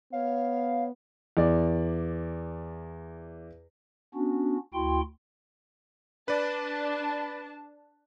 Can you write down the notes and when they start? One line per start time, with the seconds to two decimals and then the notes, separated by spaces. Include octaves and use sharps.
0.12 B3 C#5 F5
1.37 E2 D5
4.14 B3 C#4 D4 F#4
4.74 D2 E4 F#4 G5 C6
6.28 D4 B4 D5 A5